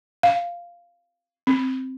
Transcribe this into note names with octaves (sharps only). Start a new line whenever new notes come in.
F5
C4